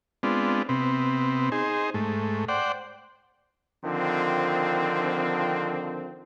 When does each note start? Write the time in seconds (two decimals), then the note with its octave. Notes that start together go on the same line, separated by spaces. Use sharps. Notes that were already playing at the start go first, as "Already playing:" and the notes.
0.23 G#3 B3 C4 D4 F4
0.69 C3 B3 C4
1.52 D#4 G#4 C5
1.94 G#2 A3
2.48 C5 D5 F#5 G5
3.85 D3 D#3 F3 C4